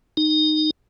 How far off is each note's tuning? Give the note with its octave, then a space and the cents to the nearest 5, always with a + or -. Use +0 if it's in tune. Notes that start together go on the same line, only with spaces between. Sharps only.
D#4 -15